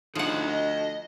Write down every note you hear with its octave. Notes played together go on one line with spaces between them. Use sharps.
D2 F3 D#4 D#5 E5 F#5
D#5